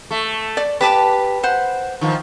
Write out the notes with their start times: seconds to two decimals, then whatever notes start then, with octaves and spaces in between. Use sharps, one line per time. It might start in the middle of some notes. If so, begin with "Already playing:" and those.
0.11 A3
0.57 D5
0.81 G4 B4 A5 D6
1.43 C5 F#5
2.01 D#3 F3